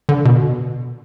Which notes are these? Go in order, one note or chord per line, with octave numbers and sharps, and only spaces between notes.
D3
B2